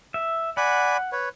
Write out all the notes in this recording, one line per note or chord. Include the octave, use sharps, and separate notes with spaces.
E5
D5 F#5 G#5 B5
B4 C#5